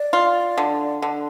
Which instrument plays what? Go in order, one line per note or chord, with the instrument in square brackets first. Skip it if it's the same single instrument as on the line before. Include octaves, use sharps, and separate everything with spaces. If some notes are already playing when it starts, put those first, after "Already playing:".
Already playing: [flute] D5
[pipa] F4
D3
D3